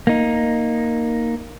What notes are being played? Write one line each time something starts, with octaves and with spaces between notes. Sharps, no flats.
A#3 D#4